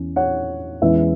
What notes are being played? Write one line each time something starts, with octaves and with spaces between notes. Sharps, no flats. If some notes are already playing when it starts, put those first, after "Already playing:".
Already playing: E2 E3 C#4
C#5 F#5
E2 E3 G#3 C#4 B4 E5